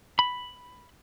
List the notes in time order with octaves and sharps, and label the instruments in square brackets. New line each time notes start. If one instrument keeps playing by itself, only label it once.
[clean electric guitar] B5